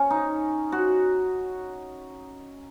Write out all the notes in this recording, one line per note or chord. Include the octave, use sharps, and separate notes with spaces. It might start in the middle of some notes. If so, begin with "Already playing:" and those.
Already playing: C#4
D#4
F#4